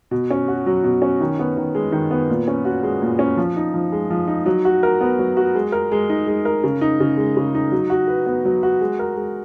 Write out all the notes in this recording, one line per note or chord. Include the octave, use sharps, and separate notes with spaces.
B2
C#4
F#4
F#3
B2
C#4
D#3
B3
D#3
G#3
D#3
B3
A#2
C#4
F#4
G#3
A#2
C#4
F3
D#4
F3
G#3
F3
D#4
F#3
F#4
A#4
B3
F#3
F#4
G#3
A#4
G#3
D#4
G#3
A#4
C#3
D#4
C#3
G#3
C#3
D#4
F#3
F#4
B4
B3
F#3
F#4
G#3
A#4
G#3